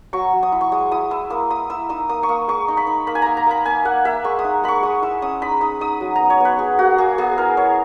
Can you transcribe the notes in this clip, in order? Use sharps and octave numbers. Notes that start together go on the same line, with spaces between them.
F#3 C#6
F#3
D#6
E4
C#6
G#3 D#6
E4 D#6
E4 E6
A#3 D#6
E4 D#6
E4 E6
D#4 D#6
A#3 D#6
C#6
A#3 D#6
G#3 C#6
D#4
B5
D#4
A#3 B5
G#5
A#3 A#5
A#5
A#3 B5
A#3 G#5
A#3 F#5
A#3 E5
G#3 C#6
D#6
D#4
G#3 B5 C#6
G#3 D#6
E4 E6
C#4 D#6
D#4 B5
D#4 D#6
D#4 D#6
F#3
B3 A#5
C#5
B3 B4
F#3 G#4
A#3 F#4
A#3 G#4
B3 G#4
E4 A#4
E4 C#5